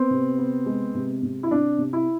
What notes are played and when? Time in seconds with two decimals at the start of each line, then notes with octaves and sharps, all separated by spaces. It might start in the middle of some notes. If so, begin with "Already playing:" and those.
Already playing: B3 C4
0.11 C3
0.38 B3
0.66 G#3
0.95 C3
1.23 C3
1.43 E4
1.51 C3 D4
1.78 C3
1.93 E4